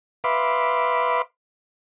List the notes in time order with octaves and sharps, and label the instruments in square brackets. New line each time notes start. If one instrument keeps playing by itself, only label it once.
[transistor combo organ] B4 E5 F5 B5 C6 D6